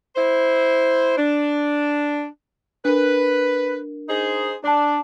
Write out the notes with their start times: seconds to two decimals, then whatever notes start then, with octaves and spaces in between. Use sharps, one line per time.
0.16 E4 C5
1.18 D4
2.85 D4 A#4 B4
4.08 D#4 G#4 C5
4.64 D4 D5 A5